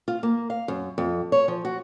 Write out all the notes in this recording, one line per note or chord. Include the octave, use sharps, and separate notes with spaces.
F4
A#3
F5
F#2
F2
C#5
F3
F#4